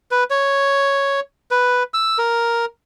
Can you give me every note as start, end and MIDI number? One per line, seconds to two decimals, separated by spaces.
0.11 0.24 71
0.30 1.20 73
1.51 1.83 71
1.94 2.18 88
2.18 2.65 70